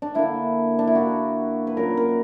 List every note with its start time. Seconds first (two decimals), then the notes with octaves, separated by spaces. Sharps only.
0.02 D4
0.15 D3 A#3 D4 E4
0.79 D4
0.87 E4
0.95 D3 A#3 D4 F#4
1.67 B4
1.77 A#2 F#3 C#4 A#4
1.97 A#4